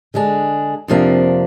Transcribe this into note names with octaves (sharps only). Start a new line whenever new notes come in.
D3 G#3 D4 G#4
F2 C3 F3 A#3 D4